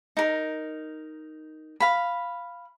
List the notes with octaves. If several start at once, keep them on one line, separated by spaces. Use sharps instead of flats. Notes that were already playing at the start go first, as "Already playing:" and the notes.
D#4 A#4
F5 B5